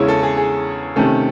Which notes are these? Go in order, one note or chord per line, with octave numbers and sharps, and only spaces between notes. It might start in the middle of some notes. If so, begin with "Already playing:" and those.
Already playing: E2 C#3 G#3 C#4 E4 C#5
A4
G#4
G#4
C3 D#3 A3 C#4 A4